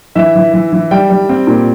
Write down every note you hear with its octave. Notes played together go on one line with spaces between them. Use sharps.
E3 E5
E3
E3
E3
G3 G5
G3
C4
A#2